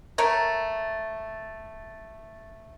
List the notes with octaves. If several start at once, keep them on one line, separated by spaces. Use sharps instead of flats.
A3 A#4 C#5